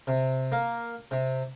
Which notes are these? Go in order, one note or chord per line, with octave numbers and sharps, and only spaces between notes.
C3
A#3
C3